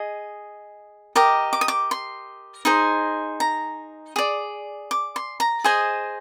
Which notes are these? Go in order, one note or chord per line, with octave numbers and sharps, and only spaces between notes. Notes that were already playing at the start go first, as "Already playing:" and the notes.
Already playing: G#4 D#5
G4 A#4 D#5 D6
D6
D#6
D6
C6
D#4 G#4 C5
A#5
G#4 D5
D6
C6
A#5
G#4 C5 D#5 G#5